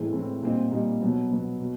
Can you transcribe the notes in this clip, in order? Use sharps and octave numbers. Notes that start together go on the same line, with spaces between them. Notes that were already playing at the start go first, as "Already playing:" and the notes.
Already playing: A2 E3 G#3 C4
A2 E3 G#3 C4
A#2 G3 C4 D#4
A#2 G3 C4 D#4
B2 F#3 B3
B2 F#3 B3
B2